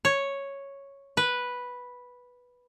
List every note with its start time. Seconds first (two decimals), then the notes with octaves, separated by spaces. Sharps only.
0.05 C#5
1.17 B4